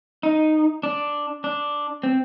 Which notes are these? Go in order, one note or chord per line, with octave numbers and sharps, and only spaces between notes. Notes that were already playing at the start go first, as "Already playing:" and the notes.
D#4
D4
D4
C4